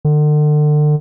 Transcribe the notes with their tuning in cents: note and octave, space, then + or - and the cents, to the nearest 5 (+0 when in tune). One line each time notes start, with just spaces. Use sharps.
D3 +35